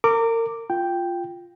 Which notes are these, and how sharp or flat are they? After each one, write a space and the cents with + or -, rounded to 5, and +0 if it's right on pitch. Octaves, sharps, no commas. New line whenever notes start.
A#4 -30 D6 +0
F4 +0 G5 +0